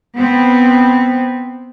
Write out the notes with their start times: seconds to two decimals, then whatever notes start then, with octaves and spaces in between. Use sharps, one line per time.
0.15 B3 C4